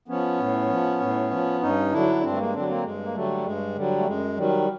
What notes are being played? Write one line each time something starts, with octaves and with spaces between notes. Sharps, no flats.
F3 B3 C#4
A2
F3
A2
F3
G2 C#4 D#4
D3 F#3 D4 E4
G2 C4 D4
A3
G#3 A#3
D3 F#3 C4 D4
A#3 C4
G2 G#3
A#3
D3 F#3 G3 A3
G2 G#3
D3 F#3 G3
A3
F#2 G#3
D#3 F#3 G3